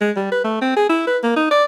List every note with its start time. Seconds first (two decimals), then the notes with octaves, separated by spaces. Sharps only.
0.01 G#3
0.16 G3
0.32 B4
0.44 A3
0.62 C4
0.76 G#4
0.89 E4
1.07 B4
1.23 A#3
1.36 D#4
1.51 D5